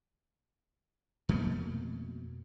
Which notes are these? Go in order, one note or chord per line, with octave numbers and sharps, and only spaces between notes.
F2 B2 A3 A#3